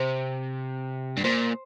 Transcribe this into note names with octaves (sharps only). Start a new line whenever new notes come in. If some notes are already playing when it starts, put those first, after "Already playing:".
Already playing: C3 C5
G2
A#2 C5